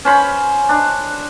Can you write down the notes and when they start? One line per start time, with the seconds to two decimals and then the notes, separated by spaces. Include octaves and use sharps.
0.05 C#4 C5 B5
0.69 D4